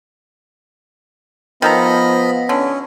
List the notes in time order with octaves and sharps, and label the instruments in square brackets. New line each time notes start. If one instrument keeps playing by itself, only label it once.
[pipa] D#3 A4 A#5 [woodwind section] F3 [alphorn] B3 [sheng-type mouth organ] D#5 B5
[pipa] D3 [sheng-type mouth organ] C#4